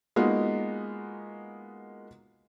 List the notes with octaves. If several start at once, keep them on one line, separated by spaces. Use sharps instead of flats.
G#3 A#3 B3 D#4 F4 F#4